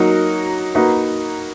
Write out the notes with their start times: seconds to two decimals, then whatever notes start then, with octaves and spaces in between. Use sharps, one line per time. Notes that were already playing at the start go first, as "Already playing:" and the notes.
Already playing: F#3 A#3 D#4 F#4 A#4
0.75 A#3 D#4 F#4 B4